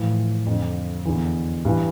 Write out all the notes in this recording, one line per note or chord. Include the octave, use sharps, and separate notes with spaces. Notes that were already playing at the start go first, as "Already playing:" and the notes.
Already playing: A2 E3 F3
F2 D3
E2 D3 E3
G2 E3